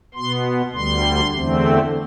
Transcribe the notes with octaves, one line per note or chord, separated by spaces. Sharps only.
B2 B3 C6
D2 D3 G3 C6
E2 D3 A3 C4